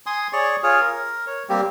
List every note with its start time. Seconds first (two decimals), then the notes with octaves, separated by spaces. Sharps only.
0.06 G#5 C6 D#6
0.33 G#4 C#5 D5 C#6
0.63 F4 G#4 C#5
0.81 A#4
1.27 C#5
1.49 G3 A#3 C4 G4